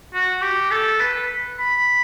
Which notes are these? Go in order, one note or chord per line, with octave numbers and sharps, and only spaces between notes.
F#4
G4
A4
B4
B5